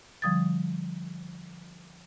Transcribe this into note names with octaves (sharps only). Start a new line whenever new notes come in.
D3 F3 G3 D#6 G#6 A6